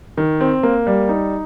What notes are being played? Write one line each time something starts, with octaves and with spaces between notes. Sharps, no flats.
D#3
C4
A#3
G3
D#4